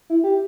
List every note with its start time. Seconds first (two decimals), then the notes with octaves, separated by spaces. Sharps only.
0.10 E4
0.24 G4